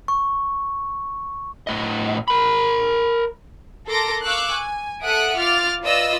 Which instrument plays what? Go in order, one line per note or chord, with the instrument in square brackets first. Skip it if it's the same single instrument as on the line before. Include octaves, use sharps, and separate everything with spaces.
[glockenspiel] C#6
[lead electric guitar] A2 D#5
A#4 B5
[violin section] A4 A#4 C6 D6 A#6 D7
F5 C#6 D6 E6 F#6
G#5
A4 E5 F#5 D#6 F#6 D7
F4 D6 F6 A6
F4 B4 D5 D#5 E6